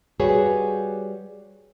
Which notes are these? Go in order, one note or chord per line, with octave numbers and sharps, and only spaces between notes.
G3 F#4 G#4 B4 C#5